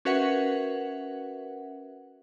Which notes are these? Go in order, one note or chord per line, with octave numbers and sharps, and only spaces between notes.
C#4 F#4 A#4 B4 E5 F#5